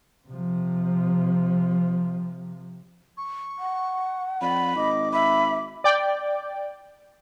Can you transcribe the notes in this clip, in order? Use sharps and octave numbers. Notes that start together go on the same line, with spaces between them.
C3 F3
C#6
F#5
F2 D5 B5
G#1 D#5 D6
E5 B5
D5 G5